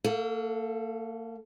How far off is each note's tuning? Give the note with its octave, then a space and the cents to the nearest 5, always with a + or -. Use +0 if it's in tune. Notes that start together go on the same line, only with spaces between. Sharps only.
A#3 -40 A4 +0 F5 +35